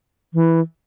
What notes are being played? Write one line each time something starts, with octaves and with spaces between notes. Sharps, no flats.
E3